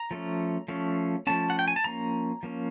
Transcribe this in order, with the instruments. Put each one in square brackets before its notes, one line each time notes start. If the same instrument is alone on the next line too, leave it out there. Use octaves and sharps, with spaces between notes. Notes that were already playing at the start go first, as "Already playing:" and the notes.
Already playing: [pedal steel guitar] A#5
F3 A3 C#4
F3 A3 C#4
F3 A3 C#4 A5
F#5
G5
G#5
A5
F3 A#3 C#4 A#5
F3 A#3 C#4